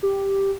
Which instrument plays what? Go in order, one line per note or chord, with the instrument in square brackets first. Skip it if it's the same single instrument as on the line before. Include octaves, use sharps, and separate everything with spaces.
[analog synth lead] G4